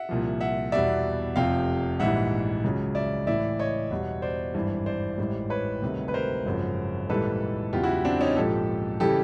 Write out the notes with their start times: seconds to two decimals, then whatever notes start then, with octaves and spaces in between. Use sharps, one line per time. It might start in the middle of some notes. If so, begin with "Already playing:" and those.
Already playing: E5 F#5
0.09 C2 A#2 F3
0.41 E5 F#5
0.72 E2 B2 G3 D5 E5
1.36 F1 F2 C3 F3 F5 G5
1.99 A#1 G#2 E3 G3 E5 F#5
2.64 C#2 C#3 F#3
2.95 D5 E5
3.27 A1 A2 E3 D5 E5
3.59 C#5 D#5
3.91 E2 B2 G3
4.22 C5 D5
4.54 G#1 G2 E3
4.86 C5 D5
5.18 A1 G#2 E3 G3
5.50 B4 C#5
5.82 D2 C3 D#3 G3
6.08 B4
6.14 A#4 C5
6.45 G#1 F#2 C#3 F3
7.09 A#1 G#2 E3 G3 A4 B4
7.73 E2 C#3 F#3 F4 G4
7.84 E4 F#4
8.05 C4 D4
8.21 C#4 D#4
8.36 A#1 G#2 F3 G4 A4
9.00 C#3 E3 G3 G4 A4